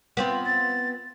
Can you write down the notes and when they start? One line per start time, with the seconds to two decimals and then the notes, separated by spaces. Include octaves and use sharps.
0.17 B3 C4 F4
0.46 A6